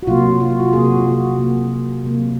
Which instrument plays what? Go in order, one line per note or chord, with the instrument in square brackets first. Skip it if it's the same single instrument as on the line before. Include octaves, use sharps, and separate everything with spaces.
[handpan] F#4
C3 F#3 A#3 F4
F4
F#4
F4
C3 F#3 A#3 G#4
F#4
F4
F#4
C3 F#3 A#3
C3 F#3 A#3